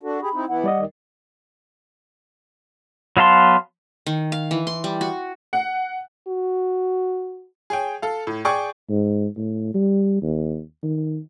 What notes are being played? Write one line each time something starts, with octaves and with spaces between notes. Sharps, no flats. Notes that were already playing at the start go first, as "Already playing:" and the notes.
D4 F#4 A4
G4 G#4 B5
C4 D#4 E4
E3 B3 E4 F#5
G3 D5 D#5
D#2 D#3
F#3 B3 F5 A5 C6
D#3
F5
E3
C6
G3
F#4
F#5
F#4
G#4 C#5 G5
A4 F5
A2
G#4 D5 G5 C#6
G#2
A2
G3
D#2
D#3